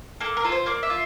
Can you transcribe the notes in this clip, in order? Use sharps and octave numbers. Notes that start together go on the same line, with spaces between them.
A#3 A4
A#4
F4 A4
C5
A#3 D5
E5
F4